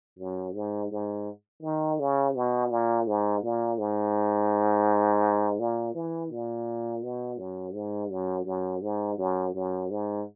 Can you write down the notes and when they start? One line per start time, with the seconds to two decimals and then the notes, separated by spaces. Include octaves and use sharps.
0.19 F#2
0.55 G#2
0.91 G#2
1.63 D#3
1.99 C#3
2.35 B2
2.71 A#2
3.07 G#2
3.43 A#2
3.78 G#2
5.59 A#2
5.95 E3
6.31 A#2
7.03 B2
7.38 F#2
7.74 G#2
8.10 F#2
8.46 F#2
8.82 G#2
9.18 F#2
9.55 F#2
9.91 G#2